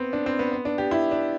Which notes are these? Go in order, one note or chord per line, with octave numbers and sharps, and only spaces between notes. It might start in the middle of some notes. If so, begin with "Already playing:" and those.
Already playing: B3 C4
D4
C4
B3
B3
D4
G4
E4
D4